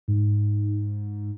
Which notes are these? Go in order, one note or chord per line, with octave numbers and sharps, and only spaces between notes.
G#2